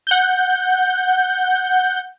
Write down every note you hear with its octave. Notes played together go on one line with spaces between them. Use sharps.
F#5 G6